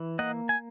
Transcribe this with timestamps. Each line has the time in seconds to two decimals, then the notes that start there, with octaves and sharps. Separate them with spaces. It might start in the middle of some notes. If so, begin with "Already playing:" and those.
Already playing: E3
0.19 A#3 D#5 F#5
0.49 G#5